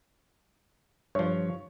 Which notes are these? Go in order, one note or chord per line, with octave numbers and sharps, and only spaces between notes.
G2 F3 C#5